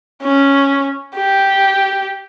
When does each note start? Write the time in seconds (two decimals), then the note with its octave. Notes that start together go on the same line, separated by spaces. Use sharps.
0.23 C#4
1.16 G4